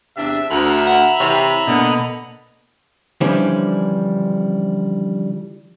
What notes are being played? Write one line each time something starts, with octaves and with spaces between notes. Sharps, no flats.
E2 C3 D4 E5
D2 E5 A#5 B5
F#5
C3 E3 C#5
B2 D3 A#3 B3 D#5
D3 E3 F3 G3 C#4 D4